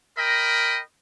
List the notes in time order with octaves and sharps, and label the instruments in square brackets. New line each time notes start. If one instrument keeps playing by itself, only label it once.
[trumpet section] A#4 D#5 G5 B5